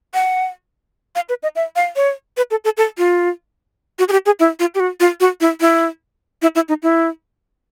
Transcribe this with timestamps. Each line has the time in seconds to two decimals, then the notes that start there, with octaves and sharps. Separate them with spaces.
0.14 F#5
1.15 F5
1.29 B4
1.43 D#5
1.56 E5
1.76 F5
1.96 C#5
2.37 B4
2.51 A4
2.65 A4
2.77 A4
2.98 F4
3.99 F#4
4.09 G#4
4.12 G4
4.26 G#4
4.40 E4
4.60 F4
4.75 G4
4.80 F#4
5.00 F4
5.20 F#4
5.41 E4
5.61 E4
6.42 E4
6.55 E4
6.69 D#4
6.83 E4